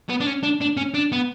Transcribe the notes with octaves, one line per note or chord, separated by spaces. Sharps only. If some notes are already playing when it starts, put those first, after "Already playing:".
B3
D4
C#4
D4
D4
C#4
D4
B3